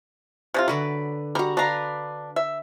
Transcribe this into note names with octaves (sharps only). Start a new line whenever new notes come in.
C3 D4 F4
D3 F#3 B4 D5
G3 F#4 A#5
D4 B4 F5 A#5
E5